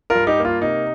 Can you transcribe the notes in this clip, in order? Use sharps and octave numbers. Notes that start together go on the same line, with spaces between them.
F4 A#4
G2
D#4 G4
A#3
F4
C3 D#4